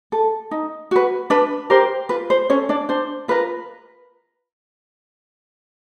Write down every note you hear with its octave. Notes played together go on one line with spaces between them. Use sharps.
A4
D#4
F#4 B4
D4 B4
G4 A#4 C5
F4 B4
C5
C#4 A4 C#5
D4 D5
D4 C5
F4 A#4 B4